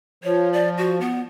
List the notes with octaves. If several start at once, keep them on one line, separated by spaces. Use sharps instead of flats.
F3 C#5
D5
F#4
B3